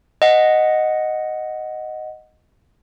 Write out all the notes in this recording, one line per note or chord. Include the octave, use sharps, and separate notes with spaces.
D#5 F#5